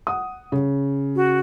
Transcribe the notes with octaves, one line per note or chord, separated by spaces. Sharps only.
F#5 D#6
C#3
F#4